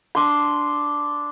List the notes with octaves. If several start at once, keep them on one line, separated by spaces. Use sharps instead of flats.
D4 C6